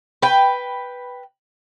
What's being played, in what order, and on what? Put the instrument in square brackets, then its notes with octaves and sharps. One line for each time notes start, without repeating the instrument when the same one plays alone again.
[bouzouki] B4 G5